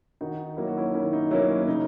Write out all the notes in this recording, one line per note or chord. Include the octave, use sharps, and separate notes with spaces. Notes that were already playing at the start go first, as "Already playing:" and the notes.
D#3 D#4 F#4
F#3 A#3 E4
F#4
C#4 E4
D#3 C#4 E4
D#4
F#3 A#3 C#4 E4
C#4
C#3 D#4